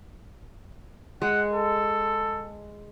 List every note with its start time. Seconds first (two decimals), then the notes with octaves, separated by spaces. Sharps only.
1.22 G#3 F#5
1.51 A4